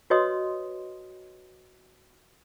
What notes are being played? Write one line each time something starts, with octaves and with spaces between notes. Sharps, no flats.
F#4 B4 C#5 D#5 C6 D#6